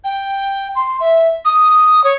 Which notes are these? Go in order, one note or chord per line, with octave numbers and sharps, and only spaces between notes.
G5
C6
E5
D#6
C#5